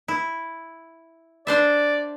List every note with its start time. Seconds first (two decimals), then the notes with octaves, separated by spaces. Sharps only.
0.08 E4
1.47 D4 C5 D5 E5